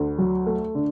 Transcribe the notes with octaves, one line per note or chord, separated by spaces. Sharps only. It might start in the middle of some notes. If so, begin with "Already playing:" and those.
Already playing: D2 D3
F#3
A3
D3